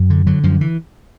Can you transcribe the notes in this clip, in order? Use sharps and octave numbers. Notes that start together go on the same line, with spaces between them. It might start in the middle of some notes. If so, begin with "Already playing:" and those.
Already playing: F#2
D3
D3 F#3
F#2 F3
E3